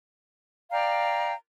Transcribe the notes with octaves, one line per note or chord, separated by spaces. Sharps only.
D5 F5 G5 A#5